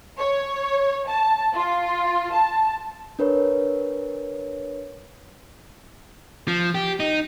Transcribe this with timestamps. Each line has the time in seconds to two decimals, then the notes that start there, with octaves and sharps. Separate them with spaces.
0.19 C#5
1.07 A5
1.54 F4
2.33 A5
3.19 D4 A#4 B4 C#5
6.48 F3
6.75 G4
7.00 D#4